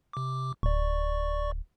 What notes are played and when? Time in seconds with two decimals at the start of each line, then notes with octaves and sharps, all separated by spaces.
0.13 C3 D6
0.63 D1 D5 C#6